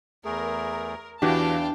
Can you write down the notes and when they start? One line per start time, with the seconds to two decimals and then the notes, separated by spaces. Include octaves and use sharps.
0.25 E2 A3 G#4 A#4
1.22 E2 E3 D4 F#4 G4 F5 G5 A5